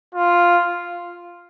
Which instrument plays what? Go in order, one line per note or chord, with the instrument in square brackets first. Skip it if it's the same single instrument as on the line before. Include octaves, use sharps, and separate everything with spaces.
[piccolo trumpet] F4